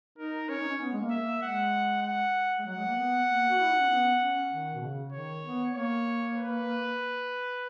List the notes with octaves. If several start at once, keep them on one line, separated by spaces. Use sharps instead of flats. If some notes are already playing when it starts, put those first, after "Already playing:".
D#4 A#4
C#4 C#5
D#4
C#4
B3
G#3
A#3
E5
A#3
G#3 F#5
F#5
G#3
F#3 F#5
G#3
A#3
B3
A#3
F#4
E4
D#4
C#4
B3
C#4
D#3
B2
C#3
D#3 C#5
B3
A#3 C#5
B4